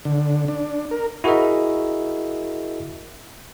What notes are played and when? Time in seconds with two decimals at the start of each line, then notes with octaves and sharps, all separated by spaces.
0.05 D3
0.48 D4
0.91 A#4
1.24 E4 F#4 G#4 A#4 D#5 E5